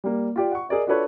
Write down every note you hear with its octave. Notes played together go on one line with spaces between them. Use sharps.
G3 A#3
F4 G4 D5
F#5 C#6
G#4 A#4 D5 D#5
D4 F4 F#4 A4 B4 C#5